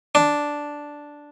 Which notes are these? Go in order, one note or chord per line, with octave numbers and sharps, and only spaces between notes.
D4